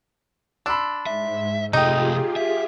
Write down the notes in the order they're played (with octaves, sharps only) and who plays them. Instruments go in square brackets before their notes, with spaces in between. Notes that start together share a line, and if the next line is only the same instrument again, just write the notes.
[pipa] D4 [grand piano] B5 C6 E6
[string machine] G#2 [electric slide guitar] E5
[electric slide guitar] C3 A3 [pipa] D#4 [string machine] F4 G4 G#4 [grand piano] D#5 G5
[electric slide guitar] E5